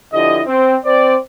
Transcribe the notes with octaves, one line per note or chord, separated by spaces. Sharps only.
D3 F3 E4 G4 D#5
C4
C4 C5 D5